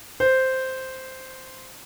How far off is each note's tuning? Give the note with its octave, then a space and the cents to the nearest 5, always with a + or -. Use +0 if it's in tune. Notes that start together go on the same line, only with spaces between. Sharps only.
C5 -5